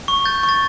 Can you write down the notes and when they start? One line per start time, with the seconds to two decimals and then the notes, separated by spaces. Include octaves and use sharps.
0.08 C#6
0.25 G6 A6
0.43 C#6
0.49 A6